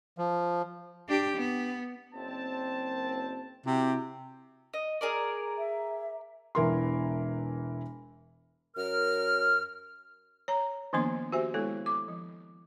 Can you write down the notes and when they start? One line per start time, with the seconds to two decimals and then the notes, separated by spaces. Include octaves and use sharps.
0.18 F3
1.08 D4 G4
1.37 B3
2.15 F#1 C4 A5
3.66 C3 E4 F#4 G4
4.73 D#5
5.01 G#4 A#4 D5
5.58 E5
6.55 E1 E3 A#4 C6
8.76 F#2 A#4 F6
10.48 C#5 A#5
10.93 D#3 F3 A#3 B3 D4 C6
11.32 F#4 G4 C5 E5 G#5
11.54 G#3 B3 E4 A4 C#5
11.86 D6
12.08 F3